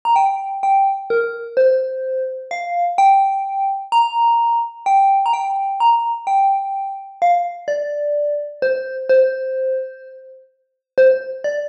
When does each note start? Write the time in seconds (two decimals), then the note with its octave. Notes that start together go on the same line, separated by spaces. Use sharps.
0.05 A#5
0.16 G5
0.63 G5
1.10 A#4
1.57 C5
2.51 F5
2.98 G5
3.92 A#5
4.86 G5
5.26 A#5
5.33 G5
5.80 A#5
6.27 G5
7.22 F5
7.68 D5
8.62 C5
9.09 C5
10.98 C5
11.44 D5